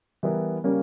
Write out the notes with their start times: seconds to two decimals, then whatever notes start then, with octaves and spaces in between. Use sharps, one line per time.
0.23 E3 G3 B3 E4 A#4
0.64 C#3 G3 A#3 C#4